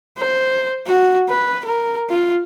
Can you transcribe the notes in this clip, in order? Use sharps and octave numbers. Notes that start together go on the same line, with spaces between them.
C5
F#4
B4
A#4
F4